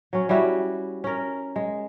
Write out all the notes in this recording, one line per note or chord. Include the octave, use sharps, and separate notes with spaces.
F#3 C#4
G3 C#4 E4 F#4
C#4 A#4
G#3